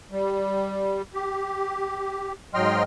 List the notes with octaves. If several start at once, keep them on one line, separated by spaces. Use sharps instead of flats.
G3
G4
G#2 F#3 D#5 G5 C6 F6